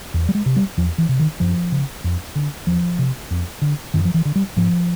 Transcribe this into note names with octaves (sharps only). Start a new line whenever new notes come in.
E2
G3
G#3
C3
G3
E2 F3
E3
C3
D#3
F#2 F3
C#3
F2
D3
E2 F3
C3
F2
D3
F#2 D#3
F3
E3
D3
G3
G#2 F3